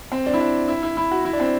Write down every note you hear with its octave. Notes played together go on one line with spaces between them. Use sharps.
C4
D4
E4
D4
E4
E4
E4
F#4
E4
D4
C4